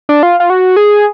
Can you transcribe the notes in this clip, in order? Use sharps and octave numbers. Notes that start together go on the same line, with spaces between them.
D4
F4
F4
F#4
G#4